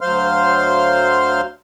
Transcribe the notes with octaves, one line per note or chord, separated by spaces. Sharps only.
D2 F#3 C5 F5 C6 F6